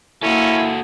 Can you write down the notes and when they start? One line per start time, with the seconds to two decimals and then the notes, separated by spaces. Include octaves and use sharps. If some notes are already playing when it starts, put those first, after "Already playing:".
0.23 A#3 C#4 E4 F#4 A4 G#5 E6